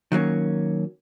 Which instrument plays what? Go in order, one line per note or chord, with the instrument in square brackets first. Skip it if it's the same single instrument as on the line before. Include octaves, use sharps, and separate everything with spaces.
[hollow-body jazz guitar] D#3 F#3 A#3 C#4